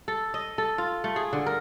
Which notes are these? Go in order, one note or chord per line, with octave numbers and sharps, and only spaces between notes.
A4
D#5
A4
F4
A3
G#4
D3
A#4